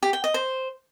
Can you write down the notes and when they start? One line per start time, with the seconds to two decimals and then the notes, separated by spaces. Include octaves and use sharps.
0.03 G4
0.13 G5
0.24 D#5
0.34 C5